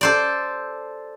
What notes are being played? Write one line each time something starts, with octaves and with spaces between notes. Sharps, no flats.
A4 C5 D5